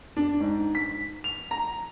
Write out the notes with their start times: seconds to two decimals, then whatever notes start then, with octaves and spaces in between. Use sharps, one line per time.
0.17 D4
0.40 G#2
0.75 B6
1.24 F7
1.51 A#5